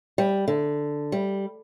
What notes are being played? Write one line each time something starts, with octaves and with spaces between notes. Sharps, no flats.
G3
D3
G3